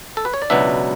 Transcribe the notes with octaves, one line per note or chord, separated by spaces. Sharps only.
A4
B4
C#5
D5
C#2 B2 F#3 B3 D4 E5